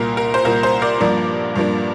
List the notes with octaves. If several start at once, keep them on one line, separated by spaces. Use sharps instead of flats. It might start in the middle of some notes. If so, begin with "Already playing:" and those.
Already playing: C2 A#2 A#3 A#4
A#4
C5
C2 A#2 A#3 A#4
C5
A#4 D5
G2 F3 A#3 D4
G2 F3 A#3 D4